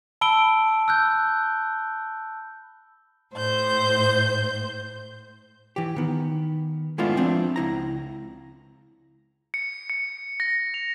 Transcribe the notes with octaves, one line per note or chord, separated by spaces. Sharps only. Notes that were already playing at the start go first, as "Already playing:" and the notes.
A5 B5 E6 D7 G7
E6 F#6 G6
A2 C5 G6
E3 G4
D#3 B3
G#3 A3 B3 D4 E4 F4
F3 C4 D4 F4
C#2 E4 A#5
C#7
C#7
A#6
F7